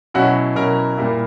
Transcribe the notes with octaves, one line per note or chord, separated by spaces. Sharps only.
B2 F#3 C#4 E4 F#4 F#5
B2 F#3 C#4 E4 A#4 A#5
A#2 G3 A#3 E4